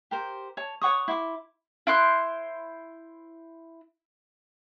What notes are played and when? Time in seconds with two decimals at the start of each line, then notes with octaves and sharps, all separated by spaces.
0.11 G4 A#4 C5
0.57 C#5 A5
0.82 C#5 F#5 C#6 D#6
1.08 E4 C6 D6
1.87 E4 C5 F#6